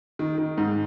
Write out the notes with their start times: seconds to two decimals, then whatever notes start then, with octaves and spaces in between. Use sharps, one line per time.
0.19 D#3
0.38 D#3
0.57 G#2